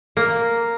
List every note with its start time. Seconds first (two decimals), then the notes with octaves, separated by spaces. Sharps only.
0.17 A#3